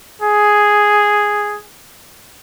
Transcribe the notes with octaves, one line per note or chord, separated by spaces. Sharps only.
G#4